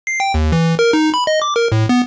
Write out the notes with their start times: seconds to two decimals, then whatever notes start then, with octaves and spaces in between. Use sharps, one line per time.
0.07 C7
0.20 G5
0.34 D#2
0.52 E3
0.79 A#4
0.93 D#4
1.14 B5
1.27 D#5
1.42 D6
1.56 A#4
1.72 A2
1.89 B3